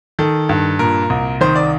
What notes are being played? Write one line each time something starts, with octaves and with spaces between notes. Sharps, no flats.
D#3 A4
G2
A#2 A#4
C2
D#3 C5
D5